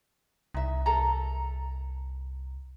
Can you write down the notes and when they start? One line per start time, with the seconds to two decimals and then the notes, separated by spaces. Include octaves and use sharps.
0.54 C2 D#4 E5
0.86 A4 A#4 A#5